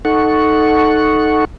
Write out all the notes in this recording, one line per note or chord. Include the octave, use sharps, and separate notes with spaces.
D#4 A4 F#5 C#6